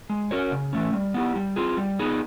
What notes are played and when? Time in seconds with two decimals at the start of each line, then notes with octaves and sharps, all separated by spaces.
0.10 G#3
0.31 C#4 F#4 A#4 C#5
0.52 C#3
0.73 E3 A3 C#4
0.93 G3
1.14 B3 E4 G4
1.36 G3
1.56 C4 F4 G#4
1.77 G3
1.99 B3 D#4 G#4